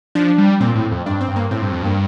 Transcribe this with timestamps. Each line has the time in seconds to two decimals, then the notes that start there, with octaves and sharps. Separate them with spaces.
0.15 F3 D4
0.38 G3
0.60 A#2 C4
0.75 A2
0.91 F2
1.06 G2 D4
1.21 C4
1.28 G2
1.36 A#3
1.51 A2 C4
1.62 G2
1.72 F2
1.82 G2 A#3